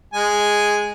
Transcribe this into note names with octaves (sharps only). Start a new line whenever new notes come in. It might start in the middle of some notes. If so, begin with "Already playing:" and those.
G#3 G#5